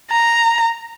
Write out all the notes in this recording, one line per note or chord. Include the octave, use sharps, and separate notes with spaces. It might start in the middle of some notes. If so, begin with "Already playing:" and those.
A#5